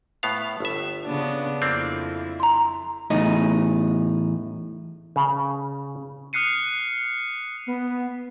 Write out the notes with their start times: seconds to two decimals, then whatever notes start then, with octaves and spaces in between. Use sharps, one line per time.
0.23 A2 B3 F5
0.60 G1 E5
1.05 C#3 B3 D4
1.62 F2 A#3 C4 D4 E4
2.40 A#5 C6
3.10 E2 A2 D#4
5.16 C#3
6.33 D#6 F6 F#6 C7 C#7 D#7
7.67 B3